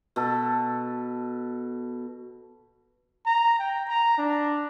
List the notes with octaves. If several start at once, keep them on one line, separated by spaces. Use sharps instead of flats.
B2 A4
A#5
G5
A#5
D4